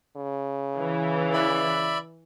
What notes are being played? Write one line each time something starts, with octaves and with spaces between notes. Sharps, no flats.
C#3
E3
D5 E5 B5